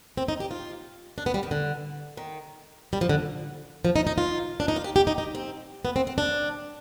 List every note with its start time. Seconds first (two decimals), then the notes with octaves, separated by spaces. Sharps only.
0.17 C4
0.28 D#4
0.40 G4
0.51 F4
1.18 D4
1.26 B3
1.34 G3
1.43 D#3
1.51 D3
2.17 D#3
2.93 G3
3.01 F3
3.09 D3
3.85 F3
3.96 D#4
4.07 D#4
4.18 F4
4.60 D4
4.68 D#4
4.76 F4
4.84 G4
4.96 G4
5.07 D#4
5.18 D#4
5.35 C4
5.85 B3
5.96 C4
6.07 C4
6.18 D4